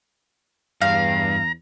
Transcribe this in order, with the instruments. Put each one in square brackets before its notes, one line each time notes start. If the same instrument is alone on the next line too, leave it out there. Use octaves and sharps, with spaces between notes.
[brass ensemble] E2 [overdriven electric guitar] G2 [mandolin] F5 [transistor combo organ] A#5